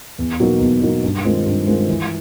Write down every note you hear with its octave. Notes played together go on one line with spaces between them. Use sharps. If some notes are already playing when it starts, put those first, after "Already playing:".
E2
B2 F#3 A#3 D#4
E2
B2 F#3 A#3 D#4
G2
D#3 G#3 C4 F4
G2
D#3 G#3 C4 F4
E3